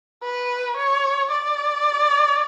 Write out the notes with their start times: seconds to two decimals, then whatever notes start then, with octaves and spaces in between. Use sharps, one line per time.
0.23 B4
0.77 C#5
1.31 D5